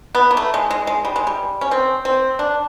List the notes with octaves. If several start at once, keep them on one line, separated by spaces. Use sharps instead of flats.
B3
A#3
A3
G#3
G#3
G#3
G3
G#3
G3
C#4
C4
C4
D4